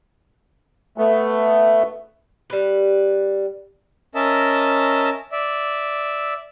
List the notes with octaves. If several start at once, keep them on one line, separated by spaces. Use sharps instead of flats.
A3 B3
G3 B4
C#4 A#4 D#5 E5 A5
D5 E5